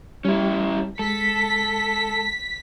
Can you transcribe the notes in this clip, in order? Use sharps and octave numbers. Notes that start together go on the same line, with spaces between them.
G3 C#4 E4 G4
G#3 A4 B6